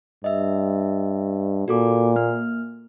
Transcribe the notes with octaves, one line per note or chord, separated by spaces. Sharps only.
G2 D#5 E5
A#2 F#4 A4 D6
A#3 F6